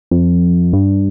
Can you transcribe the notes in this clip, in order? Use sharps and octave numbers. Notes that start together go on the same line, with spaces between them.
F2
G2